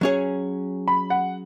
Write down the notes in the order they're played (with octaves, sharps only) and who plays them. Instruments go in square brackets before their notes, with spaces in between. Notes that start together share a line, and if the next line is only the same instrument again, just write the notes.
[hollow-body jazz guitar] F#3 C#4 G#4 C#5
[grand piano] B5
F#5